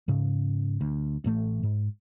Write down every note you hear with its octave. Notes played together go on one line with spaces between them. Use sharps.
G#2 C#3
D2
A1 A2 A3
G#2